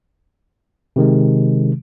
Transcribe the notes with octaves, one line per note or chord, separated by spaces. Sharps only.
C3 D#3 G#3